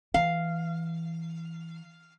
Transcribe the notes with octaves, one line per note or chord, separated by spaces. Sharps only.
E3 F5